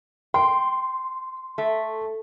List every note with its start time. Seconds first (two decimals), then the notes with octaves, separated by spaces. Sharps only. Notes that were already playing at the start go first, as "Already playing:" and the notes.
0.34 G5 C6
1.58 A3